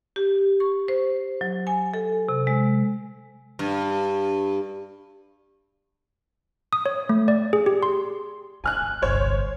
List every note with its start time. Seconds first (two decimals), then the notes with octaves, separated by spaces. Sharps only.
0.16 G4
0.60 C#6
0.88 C5
1.41 F#3
1.67 G#5
1.94 A4
2.29 C3
2.47 G#3
3.59 G2
6.73 D#6
6.86 C#5
7.09 A3
7.28 D5
7.53 G#4
7.66 G4
7.83 C6
8.64 A#3 G#5 F6 F#6
8.81 G#1
9.02 G1 C2 C5 C#5